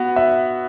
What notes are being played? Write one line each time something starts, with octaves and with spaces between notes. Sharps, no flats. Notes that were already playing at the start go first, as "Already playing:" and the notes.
Already playing: B3 F#4
E5